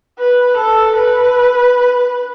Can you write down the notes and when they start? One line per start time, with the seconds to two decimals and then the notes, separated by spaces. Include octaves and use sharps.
0.19 B4
0.57 A4
0.96 B4